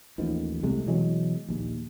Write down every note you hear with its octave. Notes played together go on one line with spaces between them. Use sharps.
A1 D#2 D#3 F3
C2 C3 G#3 A3
B2 E3 F#3 G#3
A#1 D#2